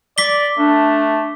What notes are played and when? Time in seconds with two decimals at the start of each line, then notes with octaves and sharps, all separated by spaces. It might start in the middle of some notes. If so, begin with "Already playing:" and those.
0.18 D5 D6 B6 G7
0.58 A3 D4